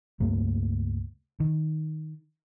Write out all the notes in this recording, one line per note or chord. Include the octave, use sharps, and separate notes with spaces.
C#2 G2 A3 A#3
D#3